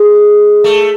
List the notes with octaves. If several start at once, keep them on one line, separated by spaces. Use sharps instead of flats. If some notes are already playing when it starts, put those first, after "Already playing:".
Already playing: G#3
A3